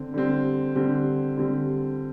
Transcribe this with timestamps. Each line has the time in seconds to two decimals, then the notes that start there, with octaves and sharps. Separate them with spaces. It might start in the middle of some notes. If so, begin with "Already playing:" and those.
Already playing: D3 C4
0.14 D3 G3 C4
0.76 D3 G3 C4
1.37 D3 G3 C4